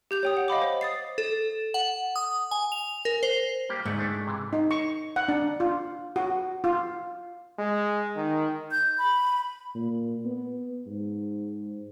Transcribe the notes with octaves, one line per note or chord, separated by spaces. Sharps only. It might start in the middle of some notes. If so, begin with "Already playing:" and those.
G4 G6 F7
C#5 G5 D#6
F#5
D#5 F5 B5 D6
C5
D#6 A6 C7
A4
F#5
D#6
G#5
F7
A#4
C5
G3 A#3 G4
D2 G#2 A3 F#5
A3 D4 E4
C3 E3
D#4
C#6
F#5
D4
F4
F#4
F4
G#3
D#3
G6
B5
A#2
B3
G#2